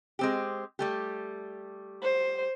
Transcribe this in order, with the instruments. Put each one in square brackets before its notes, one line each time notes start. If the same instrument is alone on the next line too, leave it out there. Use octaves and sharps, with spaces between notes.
[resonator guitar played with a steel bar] G#3 C4 G4
G3 A3 G4
[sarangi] C5